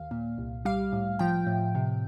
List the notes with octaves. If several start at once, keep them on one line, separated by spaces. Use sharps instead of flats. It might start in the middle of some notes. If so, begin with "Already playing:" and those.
Already playing: D#2 F5
A#2
C2
G3 F5
A2
F3 G5
A2
C3